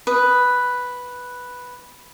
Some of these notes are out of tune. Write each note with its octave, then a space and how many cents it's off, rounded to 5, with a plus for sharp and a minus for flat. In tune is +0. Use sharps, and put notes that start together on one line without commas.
B4 +0 D#6 +0